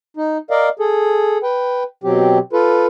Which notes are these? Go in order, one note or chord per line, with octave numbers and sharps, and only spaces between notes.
D#4
A#4 D5 D#5 F5
G#4 A4
B4 G5
B2 F#3 C4 G4
F4 A4 B4